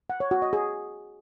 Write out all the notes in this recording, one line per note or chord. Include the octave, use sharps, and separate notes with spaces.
F#5
C#5
F#4
D#5
G#4